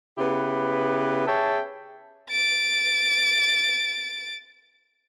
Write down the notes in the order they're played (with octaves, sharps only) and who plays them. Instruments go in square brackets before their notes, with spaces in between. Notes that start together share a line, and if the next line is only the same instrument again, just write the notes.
[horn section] C#3 B3 E4 G4 B4
G#4 C#5 E5 G5 A5
[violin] A6 D7